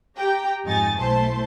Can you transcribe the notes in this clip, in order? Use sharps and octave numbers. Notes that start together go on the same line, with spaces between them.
G4 G5 A#5
F2 G#2 D#4 G#5 C#6 A6
B1 A3 E4 C5 A5 C6